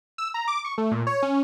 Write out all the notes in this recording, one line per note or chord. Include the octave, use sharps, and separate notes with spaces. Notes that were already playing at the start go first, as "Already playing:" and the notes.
E6
A#5
D6
C#6
A3
A#2
C#5
C#4